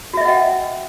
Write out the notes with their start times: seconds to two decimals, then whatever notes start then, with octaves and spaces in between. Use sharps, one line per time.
0.13 F#4
0.17 E5
0.21 D#5
0.25 F#5
0.29 G5